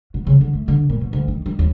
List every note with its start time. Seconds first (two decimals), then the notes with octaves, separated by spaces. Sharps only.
0.14 B2
0.27 C#3
0.41 D3
0.55 A3
0.68 D3
0.89 A#2
1.01 B2
1.13 D2
1.28 D#3
1.46 D#3
1.59 D#2